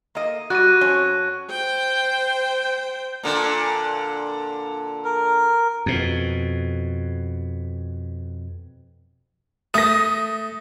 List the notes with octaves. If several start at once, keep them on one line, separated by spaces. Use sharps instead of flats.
A#3 D#5
G3 F#4 F#6 A#6 D#7
F2 C#4 C#5
C5 G5
A#2 D3
A#4
F2 B2
A3 D#6 A#6